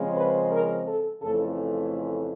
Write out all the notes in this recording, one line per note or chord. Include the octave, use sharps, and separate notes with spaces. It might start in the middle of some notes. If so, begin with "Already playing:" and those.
Already playing: C#3 F3 G#3 C4
B4
A#4
A4
F2 C#3 E3 A3 A4